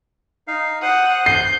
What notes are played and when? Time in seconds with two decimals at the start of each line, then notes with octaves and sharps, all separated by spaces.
0.48 D#4 F5
0.82 C5 F#5 D#6
1.26 G6 C7